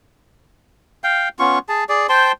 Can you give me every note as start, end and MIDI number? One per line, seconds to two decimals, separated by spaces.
1.04 1.29 77
1.04 1.29 79
1.39 1.59 59
1.39 1.59 61
1.39 1.59 65
1.39 1.59 85
1.69 1.84 68
1.69 1.84 81
1.89 2.07 68
1.89 2.07 74
2.09 2.32 72
2.09 2.32 79
2.09 2.32 81
2.09 2.32 84